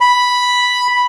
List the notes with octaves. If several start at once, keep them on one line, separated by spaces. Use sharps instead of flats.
B5